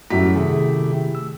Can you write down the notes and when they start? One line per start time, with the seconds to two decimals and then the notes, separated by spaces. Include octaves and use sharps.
0.10 F#2 A3 E4 F#4 G4 B6
0.35 C3 D#3 G#4
1.15 E6